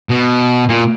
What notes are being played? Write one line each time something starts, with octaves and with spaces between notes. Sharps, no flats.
B2
A#2